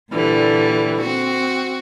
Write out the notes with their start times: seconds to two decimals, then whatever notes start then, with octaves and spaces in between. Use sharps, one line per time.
0.12 A#2 D3 E3 G3
1.00 C4 F#4